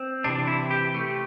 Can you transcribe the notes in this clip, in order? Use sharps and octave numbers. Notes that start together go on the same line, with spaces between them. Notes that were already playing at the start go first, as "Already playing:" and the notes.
Already playing: C4
C3 E3 D4
E4
G4
A3